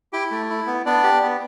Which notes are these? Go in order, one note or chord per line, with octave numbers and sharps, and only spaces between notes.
E4 G4 G5
A3
E4
B3
B3 D4 D5
G4
B3